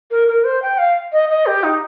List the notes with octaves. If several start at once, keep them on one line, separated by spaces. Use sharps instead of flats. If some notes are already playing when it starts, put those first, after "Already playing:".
A#4
A#4
C5
G5
F5
D#5
D#5
G4
D#4